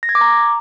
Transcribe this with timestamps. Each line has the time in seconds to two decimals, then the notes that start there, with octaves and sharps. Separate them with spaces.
0.03 A#6
0.09 G#6
0.15 D6
0.21 A#5